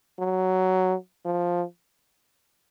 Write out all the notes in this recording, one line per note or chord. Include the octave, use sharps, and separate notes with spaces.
F#3
F3